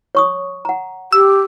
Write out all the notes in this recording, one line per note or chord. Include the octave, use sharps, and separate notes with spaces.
C#5 C#6 D#6
F#5 A#5
G4 E6